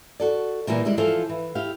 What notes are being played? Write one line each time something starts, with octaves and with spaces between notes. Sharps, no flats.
F#4 A4 D5
A#2 E3 G3 A3 A#3
G3 G#3 E4
E3 F3 F4 A4 C5 F5
E3
E4 G4 F5